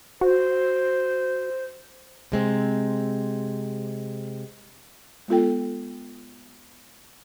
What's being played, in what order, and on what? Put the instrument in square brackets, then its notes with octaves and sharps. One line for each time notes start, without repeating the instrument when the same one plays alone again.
[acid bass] F#4 [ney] C5
[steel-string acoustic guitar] C3 G#3 C4
[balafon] G#3 B3 F4 A4 G5